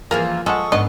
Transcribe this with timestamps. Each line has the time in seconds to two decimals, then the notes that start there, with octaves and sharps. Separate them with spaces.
0.11 E3 F3 A#3 F4 G#4 A#4
0.46 F3 G#3 A4 F#5 C#6 D#6
0.72 G#2 B3 D4 D#5